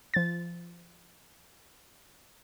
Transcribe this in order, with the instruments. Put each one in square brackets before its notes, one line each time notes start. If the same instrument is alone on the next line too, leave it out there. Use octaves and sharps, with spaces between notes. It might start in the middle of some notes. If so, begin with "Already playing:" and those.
[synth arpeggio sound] F3 A6